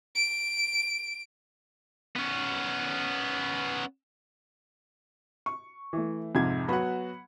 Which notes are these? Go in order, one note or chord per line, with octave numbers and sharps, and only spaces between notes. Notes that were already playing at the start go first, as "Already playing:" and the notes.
D7
B3 C#4
C#6
E3 A3
F2 G#2 C3 G#6
F#3 B3 F#4 F#5 B5